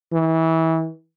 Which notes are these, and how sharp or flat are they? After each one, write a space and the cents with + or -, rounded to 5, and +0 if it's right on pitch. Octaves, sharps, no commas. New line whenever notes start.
E3 -25